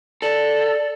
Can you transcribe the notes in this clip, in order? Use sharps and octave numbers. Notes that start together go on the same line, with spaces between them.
A4 D5